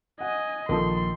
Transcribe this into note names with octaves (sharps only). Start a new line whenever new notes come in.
D#5 F#5 G#5
A#1 D#3 F3 A4 C6